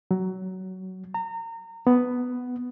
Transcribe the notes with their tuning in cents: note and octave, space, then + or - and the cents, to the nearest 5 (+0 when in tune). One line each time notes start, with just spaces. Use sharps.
F#3 +20
A#5 -30
B3 +5